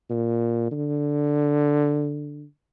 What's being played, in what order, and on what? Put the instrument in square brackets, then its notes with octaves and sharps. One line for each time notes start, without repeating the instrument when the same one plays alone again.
[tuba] A#2
D3